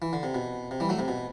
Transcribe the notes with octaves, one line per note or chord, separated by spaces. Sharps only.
E3
D3
C3
B2
C3
E3 G3
F#3 A3
C3
B2